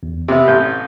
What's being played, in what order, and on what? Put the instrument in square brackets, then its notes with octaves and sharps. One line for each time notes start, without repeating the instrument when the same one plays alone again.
[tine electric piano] E2
[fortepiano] C3 B3 [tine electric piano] G4 E5
[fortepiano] A1 [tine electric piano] G6